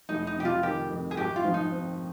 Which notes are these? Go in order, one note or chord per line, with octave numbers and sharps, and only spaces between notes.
F1 D#4
D#4
C3 G4
F4
D#3 G4
F2
G#4
G#1 G4
F4
F3
D#4
C4